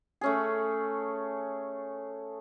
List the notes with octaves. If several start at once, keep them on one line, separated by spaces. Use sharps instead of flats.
A3 C#4 G#4